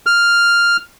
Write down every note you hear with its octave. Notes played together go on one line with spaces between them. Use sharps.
F6